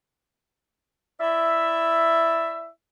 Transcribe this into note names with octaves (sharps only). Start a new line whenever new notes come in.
E4 D5 E5